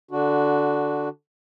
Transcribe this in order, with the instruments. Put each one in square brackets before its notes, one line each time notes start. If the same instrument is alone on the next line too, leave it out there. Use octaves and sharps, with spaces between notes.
[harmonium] D3 D4 F#4